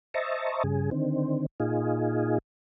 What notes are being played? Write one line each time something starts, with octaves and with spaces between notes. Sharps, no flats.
C5 D#5 E5 A5 A#5 C#6
G2 C#3 G#4
D3 D#3 C4
A#2 D#4 F4 G#4